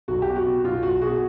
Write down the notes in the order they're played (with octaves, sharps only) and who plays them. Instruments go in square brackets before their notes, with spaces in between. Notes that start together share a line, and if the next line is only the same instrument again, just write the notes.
[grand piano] B1 F#4
B2 G4
F#4
B2
B1 F4
B1 F#4
B2 F#4 G#4